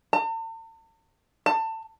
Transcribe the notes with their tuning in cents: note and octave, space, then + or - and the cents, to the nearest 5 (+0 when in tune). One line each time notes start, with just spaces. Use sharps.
A5 +45
A5 +25